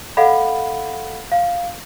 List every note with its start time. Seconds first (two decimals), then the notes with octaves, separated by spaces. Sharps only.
0.17 A4 D#5 F5 F#5 B5
1.32 F5